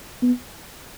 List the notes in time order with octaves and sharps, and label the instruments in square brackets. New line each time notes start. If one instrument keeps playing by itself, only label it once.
[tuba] B3